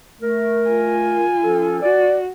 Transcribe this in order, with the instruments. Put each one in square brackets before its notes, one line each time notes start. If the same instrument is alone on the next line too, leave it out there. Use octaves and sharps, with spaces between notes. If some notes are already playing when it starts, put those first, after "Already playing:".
[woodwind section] A3 A#4
[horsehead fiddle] F4 G#5
[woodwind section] F3 C#4 A4
[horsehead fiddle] F#4 [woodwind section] D5